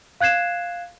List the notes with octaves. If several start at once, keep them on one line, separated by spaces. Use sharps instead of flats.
F5 F#6 G#6 C7 E7